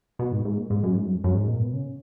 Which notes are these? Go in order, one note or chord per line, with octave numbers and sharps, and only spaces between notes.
B2
G#2
G#2
A#2
G#2
F#2
G#2
F#2
F2
F#2
G#2
A#2
B2
C#3